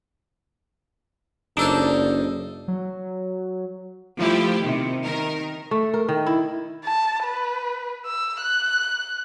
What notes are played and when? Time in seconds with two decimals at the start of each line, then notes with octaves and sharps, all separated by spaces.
1.57 F#1 D4 D#4 A4 C5
2.68 F#3
4.18 F3 A3 E4 G4
4.62 C3 D#3
5.03 D#3 A#4
5.71 A3
5.94 A#4
6.09 D#3
6.26 E4
6.84 A5
7.23 B4
8.06 E6
8.41 F#6